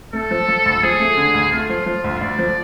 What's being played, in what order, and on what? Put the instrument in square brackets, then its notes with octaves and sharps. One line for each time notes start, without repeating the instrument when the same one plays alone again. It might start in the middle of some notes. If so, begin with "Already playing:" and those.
[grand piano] A3 [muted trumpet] A4
[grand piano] F3
F3
D2
[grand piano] F3 [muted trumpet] G#4
[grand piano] A3
D3
D2
[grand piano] A3 [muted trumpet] F4
[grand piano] F3
F3
D2
[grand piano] D2 [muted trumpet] D5
[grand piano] F3